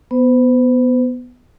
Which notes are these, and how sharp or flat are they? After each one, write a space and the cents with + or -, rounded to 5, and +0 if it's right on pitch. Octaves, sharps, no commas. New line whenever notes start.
B3 +0 C5 -40